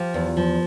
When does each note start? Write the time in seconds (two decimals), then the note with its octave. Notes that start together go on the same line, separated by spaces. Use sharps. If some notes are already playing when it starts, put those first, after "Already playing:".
Already playing: F3 F4 G4
0.14 E2
0.37 F3